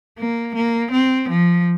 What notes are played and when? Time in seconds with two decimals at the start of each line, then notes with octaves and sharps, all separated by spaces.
0.18 A#3
0.55 A#3
0.92 C4
1.29 F3